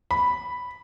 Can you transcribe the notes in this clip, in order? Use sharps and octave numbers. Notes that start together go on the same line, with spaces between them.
B5